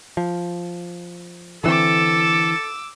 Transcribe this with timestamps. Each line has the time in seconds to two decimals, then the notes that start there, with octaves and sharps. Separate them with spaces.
0.17 F3
1.64 D3 E3 C4 A4 D6 E6